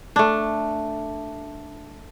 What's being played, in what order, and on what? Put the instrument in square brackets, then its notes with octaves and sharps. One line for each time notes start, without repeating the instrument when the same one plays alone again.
[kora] A3 D4